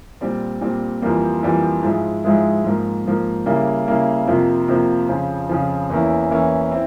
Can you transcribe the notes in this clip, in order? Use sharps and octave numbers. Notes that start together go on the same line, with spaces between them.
A#2 G3 C4
A#2 G3 C4
F2 E3 G3 A#3
F2 E3 G3 A#3
G#2 F3 G#3 E4
G#2 F3 G#3 E4
G#2 F3 A#3
G#2 F3 A#3
C#3 G3 A#3 E4
C#3 G3 A#3 E4
F2 C3 F3 A#3
F2 C3 F3 A#3
F2 C#3 F3
F2 C#3 F3
E2 E3 A#3 C#4 E4
E2 E3 A#3 C#4 E4
C4 E4